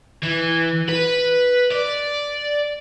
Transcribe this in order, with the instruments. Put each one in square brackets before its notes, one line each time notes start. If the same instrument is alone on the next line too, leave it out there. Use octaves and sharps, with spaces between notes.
[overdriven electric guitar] E3
B4
D5